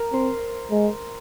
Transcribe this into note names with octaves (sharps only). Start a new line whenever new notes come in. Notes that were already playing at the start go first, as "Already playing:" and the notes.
Already playing: A#4
C4 C5
G#3